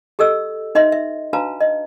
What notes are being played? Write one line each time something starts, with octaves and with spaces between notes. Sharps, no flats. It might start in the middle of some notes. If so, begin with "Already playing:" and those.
G4 A4 D#5 E6
D#4 D#5 E5 C6
E5
D4 F#4 B4 F5 A5 A#5
D#5